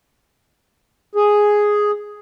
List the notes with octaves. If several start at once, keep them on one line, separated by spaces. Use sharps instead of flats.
G#4